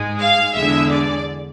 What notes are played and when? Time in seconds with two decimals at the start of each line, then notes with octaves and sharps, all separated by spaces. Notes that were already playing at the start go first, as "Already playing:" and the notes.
Already playing: G#2 G#3
0.20 F5
0.54 E2 D3 G#3 E5
0.89 D5